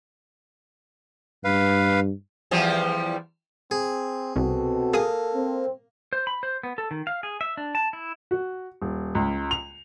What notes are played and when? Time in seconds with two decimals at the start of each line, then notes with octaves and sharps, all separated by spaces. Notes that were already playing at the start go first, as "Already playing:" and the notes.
1.44 G2 B4 F5
2.51 E2 F3 G3
3.71 C4 G#4
4.36 C2 B2 C4 F#4 A4
4.94 A#3 G#4 D#6
5.35 C4
6.13 C5
6.27 B5
6.43 C5
6.63 B3
6.78 A4
6.91 D#3
7.07 F5
7.23 G#4
7.41 E5
7.57 D4
7.75 A5
7.93 E4
8.31 F#4
8.82 D#1
9.15 C#2
9.51 F7